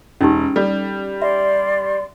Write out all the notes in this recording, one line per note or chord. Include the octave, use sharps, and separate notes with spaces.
E1 C#4 D#4 G4
G3 A4
D5 E5 C6